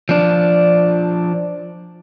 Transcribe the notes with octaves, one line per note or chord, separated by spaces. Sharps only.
F3 D4